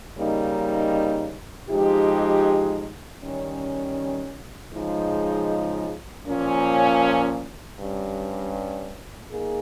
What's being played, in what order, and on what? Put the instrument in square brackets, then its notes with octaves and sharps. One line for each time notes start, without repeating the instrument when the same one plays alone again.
[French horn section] C#3 G3 A#3 D#4
F3 G#3 D#4 G4
D#3 G3 C#4
C#3 F3 G#3 D#4 G#4
A#2 F3 A#3 C#4
G2 G3 C#4
A#3 D#4 G#4